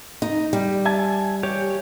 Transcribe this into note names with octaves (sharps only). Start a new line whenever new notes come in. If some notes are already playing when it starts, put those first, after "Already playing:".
D#4
G3
E5 G#5 A5
G4 C#5